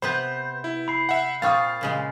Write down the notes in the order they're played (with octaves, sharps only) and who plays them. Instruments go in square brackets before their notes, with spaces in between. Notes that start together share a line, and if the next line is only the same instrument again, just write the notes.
[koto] C3 B3 B4 [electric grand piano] C5 [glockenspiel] B5 G6
[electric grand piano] E4
[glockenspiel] B5 C7
[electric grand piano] E5 F#5
[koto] A#2 C4 F4 [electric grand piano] F5 C#6 D#6 [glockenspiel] F6 A6
[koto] A#2 C#3 G#3